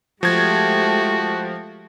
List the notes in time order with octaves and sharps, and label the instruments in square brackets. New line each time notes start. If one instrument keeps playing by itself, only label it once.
[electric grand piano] F3 G#6 [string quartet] G#3 A3 G4 [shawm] F#4